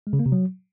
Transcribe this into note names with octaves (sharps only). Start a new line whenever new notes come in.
G#3
C#3
A#3
C3
F#3